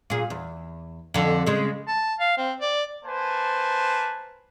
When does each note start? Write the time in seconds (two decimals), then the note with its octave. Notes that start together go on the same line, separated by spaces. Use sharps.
0.10 A#2 G#4
0.30 E2
1.14 F2 D3
1.46 C#3 G#3
1.88 A5
2.20 F5
2.38 C4
2.60 D5
3.05 A#3 B4 C5 G#5 A5